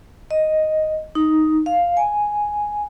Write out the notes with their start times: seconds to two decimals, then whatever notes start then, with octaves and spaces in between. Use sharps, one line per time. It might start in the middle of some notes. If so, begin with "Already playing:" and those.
0.31 D#5
1.15 D#4
1.66 F5
1.97 G#5